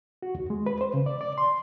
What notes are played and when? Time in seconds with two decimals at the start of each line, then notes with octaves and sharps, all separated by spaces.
0.22 F#4
0.35 D#2
0.50 G#3
0.66 B4
0.81 C5
0.94 C#3
1.06 D5
1.21 D5
1.38 C6